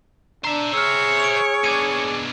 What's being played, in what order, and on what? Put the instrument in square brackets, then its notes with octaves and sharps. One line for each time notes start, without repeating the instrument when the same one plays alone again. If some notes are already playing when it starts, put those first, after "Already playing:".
[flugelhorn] D4 [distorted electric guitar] C5 E5 [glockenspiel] A#5
[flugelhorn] G#4 [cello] C#5 [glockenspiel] E6 F6
[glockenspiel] D7 F7
[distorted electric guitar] B2 D4 [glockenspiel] D6 G#6 D#7